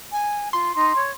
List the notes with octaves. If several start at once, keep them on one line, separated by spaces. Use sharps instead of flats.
G#5
F4 C6
D#4
C#5